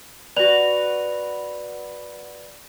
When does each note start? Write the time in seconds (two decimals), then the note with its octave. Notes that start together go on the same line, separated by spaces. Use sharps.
0.36 F#4 B4 D5 F7